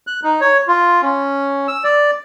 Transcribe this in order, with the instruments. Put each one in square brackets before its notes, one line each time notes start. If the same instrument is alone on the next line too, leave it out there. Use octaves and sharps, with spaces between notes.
[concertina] F#6
D#4
C#5
F4
C#4
E6
D5